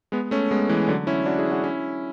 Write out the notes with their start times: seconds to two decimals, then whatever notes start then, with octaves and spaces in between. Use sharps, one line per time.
0.12 G#3 B3
0.31 A3 C#4
0.51 G#3 B3
0.69 E3 G#3
0.88 D3 F#3
1.07 C#4 E4
1.26 D4 F#4
1.39 E4 G#4
1.51 D4 F#4
1.64 C#4 E4